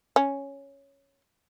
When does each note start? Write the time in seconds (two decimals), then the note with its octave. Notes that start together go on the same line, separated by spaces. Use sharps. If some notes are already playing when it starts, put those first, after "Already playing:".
0.16 C#4